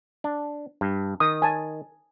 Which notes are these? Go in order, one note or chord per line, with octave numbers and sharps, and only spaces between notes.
D4
G2
D#3 D#6
G#5 A5